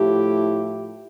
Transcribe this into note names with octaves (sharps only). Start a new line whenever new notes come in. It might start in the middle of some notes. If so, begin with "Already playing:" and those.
Already playing: A2 F3 A3 E4 G4